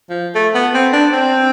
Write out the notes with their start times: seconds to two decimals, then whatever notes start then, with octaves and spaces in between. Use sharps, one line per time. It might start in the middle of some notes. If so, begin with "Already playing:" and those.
0.10 F3
0.35 A3
0.55 B3
0.74 C4
0.93 D4
1.13 C4